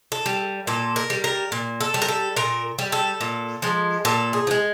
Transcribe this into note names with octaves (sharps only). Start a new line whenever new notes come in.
A4
G3
A#2 A4
A#4
G3
A#4
A#2
A4
G3
A#4
A4
A#2 A#4
G3
A4
A#2
F3 G#3
A#2 A4
G#4
F3
G#3